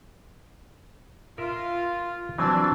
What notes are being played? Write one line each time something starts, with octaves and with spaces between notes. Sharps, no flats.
F4 A#4 E5
E3 F#3 C4 D4